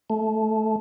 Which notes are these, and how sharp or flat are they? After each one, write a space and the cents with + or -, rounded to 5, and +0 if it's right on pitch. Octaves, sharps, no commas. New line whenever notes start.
A3 -10